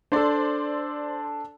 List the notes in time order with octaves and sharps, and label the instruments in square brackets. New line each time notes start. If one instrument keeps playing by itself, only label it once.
[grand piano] D4 A4 [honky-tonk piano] C5 D5